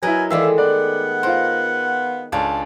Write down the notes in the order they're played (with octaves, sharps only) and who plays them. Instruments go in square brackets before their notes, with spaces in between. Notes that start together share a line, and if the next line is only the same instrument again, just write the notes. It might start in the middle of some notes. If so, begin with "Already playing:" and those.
[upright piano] F#3 E4 [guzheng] A#4 D#5 [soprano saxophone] B4 [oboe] G#5
[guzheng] D#3 G#3 A3 [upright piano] E3 D5 [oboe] E5 [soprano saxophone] F5
[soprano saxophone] B3 [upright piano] D5 [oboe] F#5
[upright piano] F4 C5 [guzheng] A#4
[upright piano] C#2 [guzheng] C#4 D4 [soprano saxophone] A5